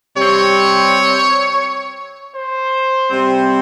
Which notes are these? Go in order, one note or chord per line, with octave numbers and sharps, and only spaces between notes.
C3 G3 C4 C#5
C5
C3 G3 C4